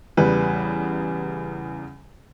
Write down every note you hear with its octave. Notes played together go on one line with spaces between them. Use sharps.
E2 C#3 G3 B4